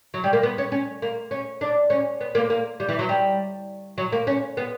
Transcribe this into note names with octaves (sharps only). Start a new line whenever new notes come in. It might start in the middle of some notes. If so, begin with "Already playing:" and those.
F#3
G3
A#3
B3
C#4
C#4
A#3
C#4
D4
C#4
B3
A#3
A#3
G3
E3
F#3
G3
F#3
A#3
C#4
B3